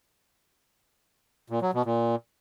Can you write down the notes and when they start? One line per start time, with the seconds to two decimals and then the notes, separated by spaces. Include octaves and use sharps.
1.50 A#2
1.62 F#3
1.74 B2
1.85 A#2